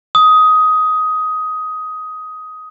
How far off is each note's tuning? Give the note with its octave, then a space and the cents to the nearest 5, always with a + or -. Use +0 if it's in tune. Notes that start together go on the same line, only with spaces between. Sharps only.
D#6 +15